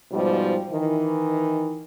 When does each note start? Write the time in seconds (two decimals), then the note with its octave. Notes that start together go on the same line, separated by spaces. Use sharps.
0.12 G#2 B2 F3 G3
0.71 D#3 E3